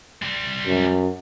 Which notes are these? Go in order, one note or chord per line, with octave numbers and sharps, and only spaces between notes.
G3 C4
F#2